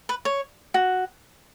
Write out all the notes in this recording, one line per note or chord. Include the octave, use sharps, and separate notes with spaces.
B4
C#5
F#4